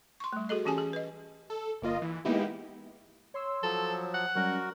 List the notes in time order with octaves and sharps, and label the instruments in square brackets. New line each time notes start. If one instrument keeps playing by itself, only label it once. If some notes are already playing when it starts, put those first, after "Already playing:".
[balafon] C6 C#6
G3 A3
F#4 G#4 A4 D#5
E3 C#4 G4 G#4 G#5 A5
G#4
B4 D#5
[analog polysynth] A4
G1 A#3 F4 D#5
E3
G#3 A#3 B3 D#4 E4 G4
[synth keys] C#5 C6 E6
[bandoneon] F3 F#3 [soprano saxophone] A4
[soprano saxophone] F#5
[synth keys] F#3 G3 C#4 [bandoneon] F#4 A#4